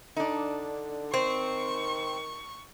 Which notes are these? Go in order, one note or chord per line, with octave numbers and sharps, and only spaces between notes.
D3 D4 D#4
D#3 C4 C#6